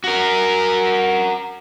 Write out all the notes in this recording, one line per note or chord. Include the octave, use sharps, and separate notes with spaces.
F#4 A#4